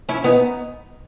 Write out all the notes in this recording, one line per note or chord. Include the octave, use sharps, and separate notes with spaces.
C#4 E4
B3 D#4